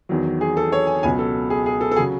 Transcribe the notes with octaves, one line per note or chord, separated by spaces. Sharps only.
E2 D#3 F#3
G#4
A4
C#5
G#5
C#2 B2 F#3 G#5
A4
G#4
G#4
A4
A4
C#3 F#3 G#4